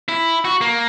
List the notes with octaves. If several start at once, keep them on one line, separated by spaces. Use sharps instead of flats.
E4
F#4
A#3